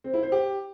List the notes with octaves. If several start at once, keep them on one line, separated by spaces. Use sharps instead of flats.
C4
E4
C5
G4